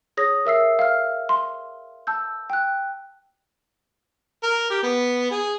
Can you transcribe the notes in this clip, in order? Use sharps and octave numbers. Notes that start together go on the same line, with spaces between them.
G#4 C#5 D#6 A#6
A#4 E5 E6 C7
F5 F6
C6
A5 E6 G6
G5 F#6
A#4
G4
B3
G#4